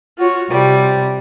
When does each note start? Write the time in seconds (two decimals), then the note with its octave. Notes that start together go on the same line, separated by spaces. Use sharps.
0.17 F4 F#4 C#5
0.50 C3 G3